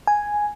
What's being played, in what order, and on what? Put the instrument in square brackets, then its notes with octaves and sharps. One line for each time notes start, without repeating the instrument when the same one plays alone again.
[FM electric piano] G#5